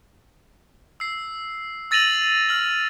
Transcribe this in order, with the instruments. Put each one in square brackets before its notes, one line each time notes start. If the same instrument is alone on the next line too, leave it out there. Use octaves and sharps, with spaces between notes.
[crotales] E6 C7
E6 A6 A#6 D#7 F7 F#7
F6 F#7